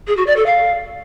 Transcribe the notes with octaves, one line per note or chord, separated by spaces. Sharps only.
G#4
F#4
D5
A4
F5